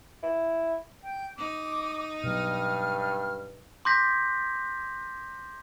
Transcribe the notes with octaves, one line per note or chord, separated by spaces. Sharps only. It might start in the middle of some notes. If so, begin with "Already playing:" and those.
E4
G5
D#4 D6
G2 B2 F#3 F6
C6 D6 G6 A#6 B6